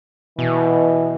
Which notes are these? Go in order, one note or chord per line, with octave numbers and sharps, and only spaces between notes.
B2 E3